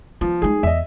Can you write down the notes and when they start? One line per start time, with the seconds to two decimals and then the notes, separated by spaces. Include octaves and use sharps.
0.21 F3 B3
0.42 G#3 D#4 G#4
0.63 E2 D#5 E5